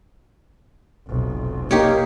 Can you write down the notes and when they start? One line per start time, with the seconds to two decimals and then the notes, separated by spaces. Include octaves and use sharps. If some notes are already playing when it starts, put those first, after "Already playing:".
1.08 F1 B1
1.71 A#3 D#4 G4 C#5